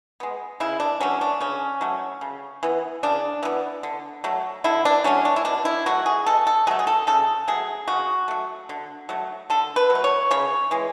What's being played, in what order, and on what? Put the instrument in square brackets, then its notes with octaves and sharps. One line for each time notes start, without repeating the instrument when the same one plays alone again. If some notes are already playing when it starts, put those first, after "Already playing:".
[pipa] G#3 B3
C#3 E4
D4
F#3 A3 C#4
D4
C#3 C#4
F#3 A3
C#3
E3 B3
C#3 D4
E3 B3
D3
F#3 A3
D3 E4
D4
F#3 A3 C#4
D4
E4
B2 D4
E4
F#3 A3 F#4
G#4
B2 A4
A4
F#3 G#4
A3
G#4
A4
C#3 A4
F#3 A3 G#4
C#3 F#4
F#3 A3
D3
F#3 A3
D3 A4
B4
F#3
A3
C#5
C#3 C#5
E3 G#3